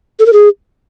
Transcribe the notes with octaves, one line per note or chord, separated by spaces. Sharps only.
A4
A#4
G#4